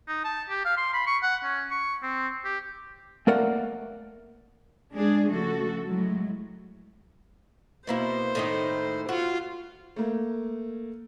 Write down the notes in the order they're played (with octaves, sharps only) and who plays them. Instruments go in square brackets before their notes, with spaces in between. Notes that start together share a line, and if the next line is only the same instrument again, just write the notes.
[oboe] D#4
A5
G4
F5
C6
B5
C#6
F#5
C#4
C#6
C4
G4
[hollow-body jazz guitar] A3 A#3 A#4 D5 F#5
[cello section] G#3 D4 G#4
C#3 F3 A3 F#4 A4
A2 F#3 G#3
[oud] B2 A#3 E4 [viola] C5
[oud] A2 D#3 D#4
[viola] F4 [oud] F#4
[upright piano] A3 A#3